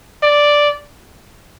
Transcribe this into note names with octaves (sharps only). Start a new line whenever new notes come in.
D5